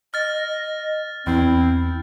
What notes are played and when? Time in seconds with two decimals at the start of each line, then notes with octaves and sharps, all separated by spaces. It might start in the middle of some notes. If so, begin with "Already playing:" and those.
0.14 D#5 F6 A6
1.27 E2 C4 E4